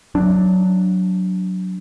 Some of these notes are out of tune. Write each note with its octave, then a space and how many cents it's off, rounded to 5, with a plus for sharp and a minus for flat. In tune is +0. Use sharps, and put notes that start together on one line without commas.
F#3 +0 D4 +0